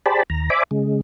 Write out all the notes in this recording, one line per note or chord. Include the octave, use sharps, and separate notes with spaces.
G4 G#4 C5 D5 A5 B5
D#2 A#5
C5 D5 E5 G#5 B5 D6
C#3 G#3